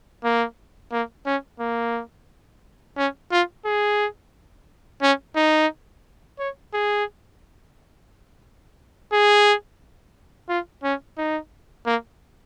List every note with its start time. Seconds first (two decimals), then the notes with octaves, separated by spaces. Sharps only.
0.24 A#3
0.92 A#3
1.26 C#4
1.60 A#3
2.97 C#4
3.32 F4
3.65 G#4
5.02 C#4
5.36 D#4
6.39 C#5
6.73 G#4
9.13 G#4
10.49 F4
10.84 C#4
11.18 D#4
11.86 A#3